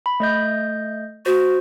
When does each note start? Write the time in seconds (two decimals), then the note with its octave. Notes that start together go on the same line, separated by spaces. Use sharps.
0.06 B5
0.20 A3 D#5 G6
1.26 F#4 C5